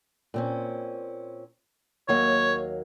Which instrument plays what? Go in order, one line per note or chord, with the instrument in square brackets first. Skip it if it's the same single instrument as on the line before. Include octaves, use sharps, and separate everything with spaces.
[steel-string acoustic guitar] A#2 C4 C#4
[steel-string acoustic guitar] D#2 F#3 A#3 [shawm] C#5